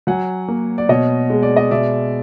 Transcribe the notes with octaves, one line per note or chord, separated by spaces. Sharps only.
F#3 F#5 G#5
A#3
D5
B2 C#5 D#5
G#3
D5
D#5
B2 D5 E5